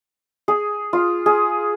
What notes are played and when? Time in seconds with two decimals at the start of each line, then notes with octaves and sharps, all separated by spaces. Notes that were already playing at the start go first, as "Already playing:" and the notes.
0.48 G#4
0.93 F4
1.26 G#4